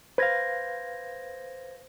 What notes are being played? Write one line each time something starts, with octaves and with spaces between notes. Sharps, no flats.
B4 C5 F5 G#6 A#6